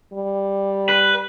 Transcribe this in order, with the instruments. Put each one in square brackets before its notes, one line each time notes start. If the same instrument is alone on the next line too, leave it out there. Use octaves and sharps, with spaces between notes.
[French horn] G3
[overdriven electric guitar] B4